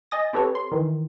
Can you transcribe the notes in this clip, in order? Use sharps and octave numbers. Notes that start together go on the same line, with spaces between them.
D#5 G#5 D#6 A6 A#6
C4 G4 A4 B4 C#5
C6
D#3 E3